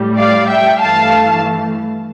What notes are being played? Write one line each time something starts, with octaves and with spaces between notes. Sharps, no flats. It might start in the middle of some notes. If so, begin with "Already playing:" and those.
Already playing: A2 G3
D5 F5
E5 G5
G2 E3 A3 F5 A5